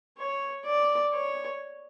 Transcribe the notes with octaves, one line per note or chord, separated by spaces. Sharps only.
C#5
D5
C#5